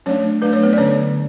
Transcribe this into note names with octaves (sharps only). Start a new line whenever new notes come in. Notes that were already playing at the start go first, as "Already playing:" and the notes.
F#3 A3 C#4 D4 C#5
F#3 A3 D4 B4
C#5
B3 B4
D5
D3 F#3 C#4 C#5